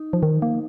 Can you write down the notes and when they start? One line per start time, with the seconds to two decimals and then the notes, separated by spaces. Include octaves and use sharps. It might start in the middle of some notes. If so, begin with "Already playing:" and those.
Already playing: D#4
0.13 F3
0.23 D#3
0.42 A#3